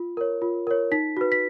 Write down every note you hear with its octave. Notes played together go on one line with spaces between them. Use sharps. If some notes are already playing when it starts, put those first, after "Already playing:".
Already playing: F4
A#4 C#5
F4
A#4 C#5
D#4 B6
F#4 B4
B6